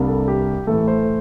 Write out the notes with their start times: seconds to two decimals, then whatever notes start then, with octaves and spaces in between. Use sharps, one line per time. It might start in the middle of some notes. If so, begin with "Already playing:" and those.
Already playing: C2 C3 G3 A#3 D4
0.08 A4
0.28 G4
0.67 A2 E3 A3 A4
0.88 C5